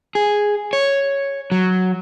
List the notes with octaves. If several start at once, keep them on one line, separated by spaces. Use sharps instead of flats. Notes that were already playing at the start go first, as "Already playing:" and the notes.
G#4
C#5
F#3